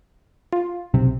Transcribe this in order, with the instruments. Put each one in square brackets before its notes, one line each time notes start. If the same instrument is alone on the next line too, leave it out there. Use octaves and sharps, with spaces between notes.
[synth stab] F4
[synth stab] B1 [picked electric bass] C3